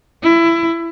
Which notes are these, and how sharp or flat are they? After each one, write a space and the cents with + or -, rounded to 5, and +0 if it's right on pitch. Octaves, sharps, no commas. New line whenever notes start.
E4 +20